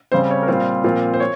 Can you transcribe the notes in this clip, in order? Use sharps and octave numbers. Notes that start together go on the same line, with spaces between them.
C#3 G3 C4 C5
C#5
A#4
A#2 G3 C4 F4 C5
A#2 F3 C4 F4
C5
C#5